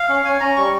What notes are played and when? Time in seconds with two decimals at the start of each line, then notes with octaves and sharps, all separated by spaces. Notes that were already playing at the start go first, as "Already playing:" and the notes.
Already playing: F5
0.09 C#4
0.25 C#4 G#5
0.40 C#4 A#5
0.56 G3 C#6